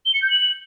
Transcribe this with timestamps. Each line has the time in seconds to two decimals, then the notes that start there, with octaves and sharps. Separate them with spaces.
0.05 G7
0.14 C#7
0.22 G6
0.30 F#7